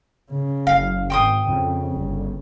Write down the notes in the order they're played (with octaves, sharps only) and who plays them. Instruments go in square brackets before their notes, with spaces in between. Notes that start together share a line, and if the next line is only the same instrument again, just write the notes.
[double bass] C#3
[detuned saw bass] F#1 [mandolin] F5
[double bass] G#1 [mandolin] G5 C6 D#6
[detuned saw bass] F2 [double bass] C#3
[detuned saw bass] G1